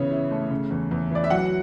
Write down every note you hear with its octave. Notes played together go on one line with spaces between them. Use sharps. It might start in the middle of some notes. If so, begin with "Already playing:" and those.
Already playing: C#3 E3 B3 C#5
E4
A3
C#3
E2
E2
E3 D5
E5
F#3 F#5